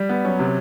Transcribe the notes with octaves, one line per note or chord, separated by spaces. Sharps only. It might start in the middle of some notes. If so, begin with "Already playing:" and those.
Already playing: G3
B3
F#3 C#4
C3